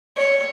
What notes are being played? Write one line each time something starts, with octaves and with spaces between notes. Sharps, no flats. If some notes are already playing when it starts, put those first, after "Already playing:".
C#5